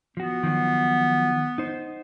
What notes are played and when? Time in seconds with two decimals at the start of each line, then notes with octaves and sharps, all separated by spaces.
0.17 F3 B3 F#4
0.43 D#3 F3 F#3
1.58 D#4 C5